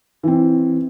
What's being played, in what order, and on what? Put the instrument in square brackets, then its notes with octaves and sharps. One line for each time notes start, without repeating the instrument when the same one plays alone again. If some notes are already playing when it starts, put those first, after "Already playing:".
[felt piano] E3 C4